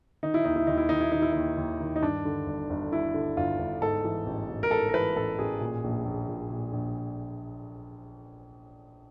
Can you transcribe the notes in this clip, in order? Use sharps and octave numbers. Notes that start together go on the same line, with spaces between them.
D#3 D#4
E4
D#2 D#4
E4
D#2 D#4
E4
D#3 D#4
E4
D#3 D#4
E4
D#2 D#4
D#2
D#3
D#4
G2 D4
D3
G1
G1
G2 E4
D3
G1 F4
G1
G#2 A4
E3
A1
A1
A#4
G#2 A4
A#4
E3 B4
A1 A4
A1 G#4
A#2
A#1
A#1
A#2
A#2
A#1